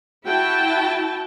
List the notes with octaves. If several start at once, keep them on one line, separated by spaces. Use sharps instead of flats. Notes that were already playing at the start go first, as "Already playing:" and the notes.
E4 F#4 G5 A5